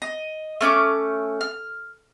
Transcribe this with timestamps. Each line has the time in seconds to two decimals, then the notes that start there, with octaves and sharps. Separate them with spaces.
0.02 D#5
0.61 A3 C#4 D6
1.41 F6